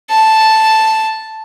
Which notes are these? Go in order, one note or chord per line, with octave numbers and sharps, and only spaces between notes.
A5